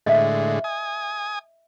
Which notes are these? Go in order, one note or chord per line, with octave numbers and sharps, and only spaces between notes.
A2 D3 G#3 D#5 E5
G#5 D#6